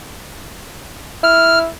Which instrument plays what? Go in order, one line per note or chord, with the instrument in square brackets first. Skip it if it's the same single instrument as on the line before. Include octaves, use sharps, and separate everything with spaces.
[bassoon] E4 [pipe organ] F6